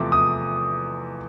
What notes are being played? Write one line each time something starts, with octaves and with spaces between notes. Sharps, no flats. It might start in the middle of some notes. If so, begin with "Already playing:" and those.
Already playing: E2 C3 F3 A3 D6
D#6